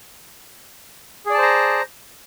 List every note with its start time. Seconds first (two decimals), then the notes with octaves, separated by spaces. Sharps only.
1.26 G#4
1.30 D5
1.34 A5
1.38 C5
1.42 A#5